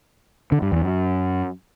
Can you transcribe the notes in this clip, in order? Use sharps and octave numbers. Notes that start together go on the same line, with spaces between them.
D3
G2
E2
F#2